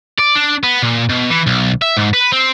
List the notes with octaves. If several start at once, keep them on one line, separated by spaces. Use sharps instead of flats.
D5
D4
B3
A#2
B2
E3
B1
E5
G#2
B4
C4